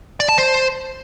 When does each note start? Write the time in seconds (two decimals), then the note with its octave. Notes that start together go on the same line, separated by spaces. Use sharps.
0.20 D5
0.29 A5
0.38 C5